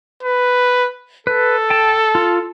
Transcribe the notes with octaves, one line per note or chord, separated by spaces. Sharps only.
B4
A4 B4
G5 A5
F4